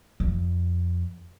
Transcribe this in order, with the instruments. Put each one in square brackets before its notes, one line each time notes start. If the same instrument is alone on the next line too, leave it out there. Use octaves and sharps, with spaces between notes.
[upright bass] F2